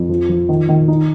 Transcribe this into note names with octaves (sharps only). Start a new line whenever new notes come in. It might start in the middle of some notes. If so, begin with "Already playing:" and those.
Already playing: F2
F3
F3
D#3
D#3
D#4